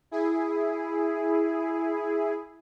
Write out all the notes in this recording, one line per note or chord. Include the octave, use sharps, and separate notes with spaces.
E4 G#4